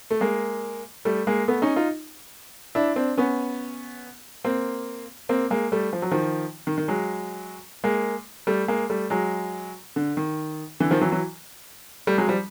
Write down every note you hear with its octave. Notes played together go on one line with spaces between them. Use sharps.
A3
G#3 A#3
G3 A3
G#3 A#3
A3 B3
C#4 D#4
D#4 F4
D4 E4
C4 D4
B3 C#4
A#3 C4
A#3 C4
G#3 A#3
G3 A3
F3
F#3
D#3 F3
D#3
D#3
F#3 G#3
G#3 A#3
G3 A3
G#3 A#3
G3 A3
F#3 G#3
D3
D#3
D3 E3
D#3 F3
E3 F#3
E3 F#3
G3 A3
F#3 G#3
F3 G3